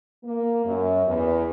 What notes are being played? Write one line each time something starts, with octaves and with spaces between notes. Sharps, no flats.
A#3
F#2
E2